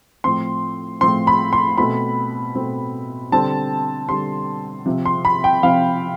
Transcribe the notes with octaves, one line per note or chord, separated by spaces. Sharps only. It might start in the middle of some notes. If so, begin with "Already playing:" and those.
A2 F3 C4 C6
A2 F3 C4 C6
B5
C6
B2 A3 C4 B5
B2 A3 C4
D3 G3 C4 A5
D3 G3 C4 C6
C3 F3 C4
C6
B5
G5
C3 F3 C4 F5